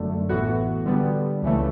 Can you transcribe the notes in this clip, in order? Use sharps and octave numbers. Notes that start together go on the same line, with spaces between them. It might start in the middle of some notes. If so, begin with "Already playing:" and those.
Already playing: G1 F#2 D3 A3
A1 A2 E3 B3 F#4
D3 G3 B3
C#2 C#3 E3 A3